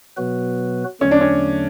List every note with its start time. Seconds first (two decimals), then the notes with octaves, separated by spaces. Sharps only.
0.17 B2 F#3 B3 F#4 B4
1.01 E2 D3 F#3 A3 C#4
1.11 D4
1.21 C#4